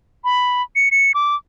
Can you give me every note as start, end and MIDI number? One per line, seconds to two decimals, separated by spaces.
0.24 0.62 83
0.76 0.89 97
0.91 1.12 97
1.14 1.36 86